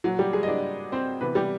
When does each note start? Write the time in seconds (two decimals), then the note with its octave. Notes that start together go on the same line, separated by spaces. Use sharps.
0.04 A#2 F#3 F#4
0.19 G3 G4
0.33 G#3 G#4
0.43 D#5
0.48 D4 D5
0.92 C4 C5
1.21 C3 E3 B3 B4
1.35 G3 G4